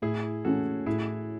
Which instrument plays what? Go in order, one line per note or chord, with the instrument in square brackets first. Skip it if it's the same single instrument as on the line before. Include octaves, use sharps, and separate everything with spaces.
[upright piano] A2 [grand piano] E4 G#4
[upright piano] E3 A3 C#4 [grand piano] F#4 A4
[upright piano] A2 [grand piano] E4 G#4